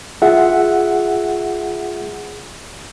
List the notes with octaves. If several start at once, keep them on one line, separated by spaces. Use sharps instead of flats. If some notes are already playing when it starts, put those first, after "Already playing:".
F4 G#4 E5 F#5